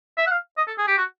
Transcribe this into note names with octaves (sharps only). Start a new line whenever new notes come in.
E5
F#5
F5
D#5
A4
G#4
G4
F#4